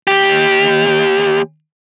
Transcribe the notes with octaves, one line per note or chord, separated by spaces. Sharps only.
D#2 G4